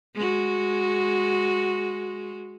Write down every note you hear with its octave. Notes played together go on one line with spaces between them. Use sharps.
G#3 F#4